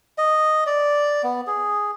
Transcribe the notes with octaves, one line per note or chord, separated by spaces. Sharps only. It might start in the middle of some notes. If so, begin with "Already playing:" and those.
D#5
D5
B3
G#4